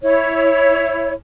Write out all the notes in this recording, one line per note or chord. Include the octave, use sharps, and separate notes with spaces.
E4 C#5